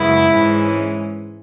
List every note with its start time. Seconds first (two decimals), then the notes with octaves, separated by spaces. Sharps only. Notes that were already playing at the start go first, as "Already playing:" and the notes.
Already playing: F#2 C#3 G#3 B3 E4
0.29 G#2 E3 G#3 C#4